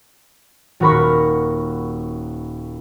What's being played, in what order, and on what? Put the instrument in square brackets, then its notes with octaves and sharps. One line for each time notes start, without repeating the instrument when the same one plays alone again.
[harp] D#1 F#4 A#4 B5 C#6